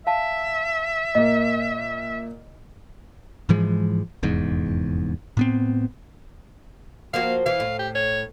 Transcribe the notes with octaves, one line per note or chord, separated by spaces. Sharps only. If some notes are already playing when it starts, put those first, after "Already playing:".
E5 F5 A5
A#2 A#3 D#5
G#2 E3 F3 G#3
F1 E2 G#2
A2 B3 C4
F3 A#3 F#4 F5
E3 F5
A2
G4
C#5